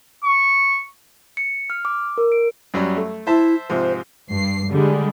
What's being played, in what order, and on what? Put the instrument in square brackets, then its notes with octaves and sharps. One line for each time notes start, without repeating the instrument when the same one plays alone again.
[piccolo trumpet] C#6
[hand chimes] C#7
F6
D6
A#4
D7
[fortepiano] F#2 F#3 G3
A3
[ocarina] E4 [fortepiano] C5 E5 A5
[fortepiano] G#2 C3 F3 [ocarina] C5
[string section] G2 C7
D3 G3 G#3